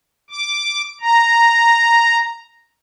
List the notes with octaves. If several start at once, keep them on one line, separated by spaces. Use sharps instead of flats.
D6
A#5